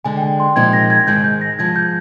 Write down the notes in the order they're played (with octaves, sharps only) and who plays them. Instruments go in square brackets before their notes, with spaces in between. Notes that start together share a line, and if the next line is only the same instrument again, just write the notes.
[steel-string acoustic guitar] D3 G#3 D4 [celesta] G#5
[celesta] G5
G#5
C6
[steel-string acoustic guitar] A#2 F3 G#3 C4 D#4 [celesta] G#6
[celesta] A#6
G#6
[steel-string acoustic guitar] G#2 D#3 G#3 [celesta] G6
[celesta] G6
A#6
[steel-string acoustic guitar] G#2 F3 G#3 [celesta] G#6
[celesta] G6